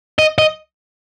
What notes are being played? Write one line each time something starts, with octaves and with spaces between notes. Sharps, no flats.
D#5
D#5